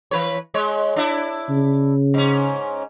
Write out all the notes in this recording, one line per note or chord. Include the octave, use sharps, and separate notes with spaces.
E3 B4 C#5
G#3 C#5
D4 E4
C#3
G#2 C#4